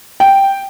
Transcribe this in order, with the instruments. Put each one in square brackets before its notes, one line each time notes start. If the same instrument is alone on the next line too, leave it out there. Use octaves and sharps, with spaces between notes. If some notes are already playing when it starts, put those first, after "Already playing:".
[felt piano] G5